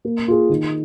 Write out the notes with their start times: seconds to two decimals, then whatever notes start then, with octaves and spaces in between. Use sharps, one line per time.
0.05 A#3
0.28 F4 G#4
0.50 D#3